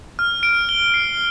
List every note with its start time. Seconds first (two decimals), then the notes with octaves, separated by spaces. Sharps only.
0.19 F6
0.43 D7
0.69 G7
0.94 C7